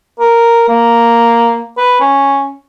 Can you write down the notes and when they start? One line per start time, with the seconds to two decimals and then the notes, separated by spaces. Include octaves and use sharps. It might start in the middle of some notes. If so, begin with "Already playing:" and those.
0.20 A#4
0.69 A#3
1.77 B4
2.00 C#4